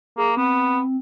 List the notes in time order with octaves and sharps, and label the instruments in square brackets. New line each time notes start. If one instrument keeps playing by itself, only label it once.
[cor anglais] A#3 [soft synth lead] G#4
[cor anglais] B3 [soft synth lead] C4